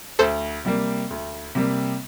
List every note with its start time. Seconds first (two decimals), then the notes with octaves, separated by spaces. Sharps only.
0.19 D2 A4 C5
0.65 C3 G3 A#3
1.11 D2
1.55 C3 G3 A#3